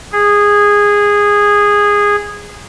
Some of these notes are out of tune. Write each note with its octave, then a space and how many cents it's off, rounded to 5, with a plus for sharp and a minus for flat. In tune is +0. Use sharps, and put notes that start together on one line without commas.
G#4 -15